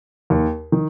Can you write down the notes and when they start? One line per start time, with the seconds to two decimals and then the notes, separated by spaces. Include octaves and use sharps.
0.30 D#2
0.72 D#3